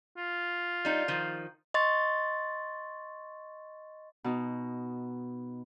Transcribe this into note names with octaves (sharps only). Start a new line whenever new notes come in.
F4
G3 D#4
D#3 F3
D#5 C6 C#6 A6
B2 D#4